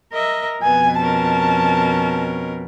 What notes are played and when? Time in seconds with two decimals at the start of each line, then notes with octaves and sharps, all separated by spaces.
0.13 A#4 D#5 E5
0.63 F2 B2 B3 G#5
1.00 C#4 A#4 A5